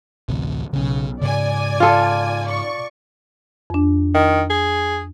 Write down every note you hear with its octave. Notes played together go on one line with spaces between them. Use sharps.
A1 D2 C3
B1 C#3 C#4
G#2 C#3 D5 G#5
F4 A4
D5 C#6
F2 D4
D#3
G#4